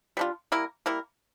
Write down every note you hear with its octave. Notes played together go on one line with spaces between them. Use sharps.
G3 D4 F4
G3 A#3 E4 A#4
G3 A#3 E4 A#4